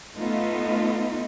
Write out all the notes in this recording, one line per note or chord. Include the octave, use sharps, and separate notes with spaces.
A3 B3 D#4 F4